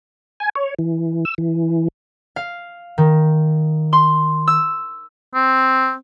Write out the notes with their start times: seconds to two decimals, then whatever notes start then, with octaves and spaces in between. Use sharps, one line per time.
0.40 G#5
0.55 C#5
0.79 E3
1.25 E6
1.38 E3
2.36 F5
2.98 D#3
3.93 C6
4.48 E6
5.35 C4